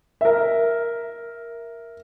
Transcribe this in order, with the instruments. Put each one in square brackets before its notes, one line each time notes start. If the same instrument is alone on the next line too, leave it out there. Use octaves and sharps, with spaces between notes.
[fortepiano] A#4 E5